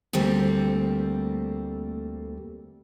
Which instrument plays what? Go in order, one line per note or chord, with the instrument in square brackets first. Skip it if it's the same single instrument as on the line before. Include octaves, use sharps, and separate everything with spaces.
[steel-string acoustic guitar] D2 G3 A3 A#3 C4